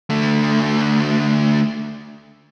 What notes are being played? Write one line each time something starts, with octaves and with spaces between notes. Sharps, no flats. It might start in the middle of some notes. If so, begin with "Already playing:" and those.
D3 A3